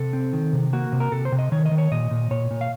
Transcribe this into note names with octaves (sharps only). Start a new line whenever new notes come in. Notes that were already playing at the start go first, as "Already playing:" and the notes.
Already playing: C3 A4
C4
D#3
C3
A#3 F#4
C3
A#4
C3 A4
C5
C3
D#5
D#3 C#5
D#5
D#3
C#5
A#2 D#5
A#2
A#2 C#5
A#2
F5